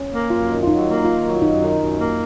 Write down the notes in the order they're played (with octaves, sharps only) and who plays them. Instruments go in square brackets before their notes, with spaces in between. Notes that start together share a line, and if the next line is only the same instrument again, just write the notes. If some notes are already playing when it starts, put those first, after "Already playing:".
Already playing: [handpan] C#4
[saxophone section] A#3
[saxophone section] F#2 [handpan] F4
[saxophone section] D#3
[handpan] F4
[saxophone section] F#3 [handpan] D#4
[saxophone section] A#3
[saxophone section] D#3 [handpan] F4
[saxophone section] F#3
[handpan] F4
[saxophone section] F#2 [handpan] D#4
[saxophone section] D#3
F#2
A#3